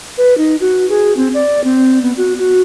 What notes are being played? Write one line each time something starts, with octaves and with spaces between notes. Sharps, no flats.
B4
D#4
F#4
G#4
C4
D5
C4
B3
F#4
F#4